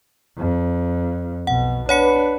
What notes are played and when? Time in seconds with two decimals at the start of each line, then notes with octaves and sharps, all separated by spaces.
0.37 F2
1.47 B1 B2 F#5
1.89 D4 B4 C#5 F#5 C#7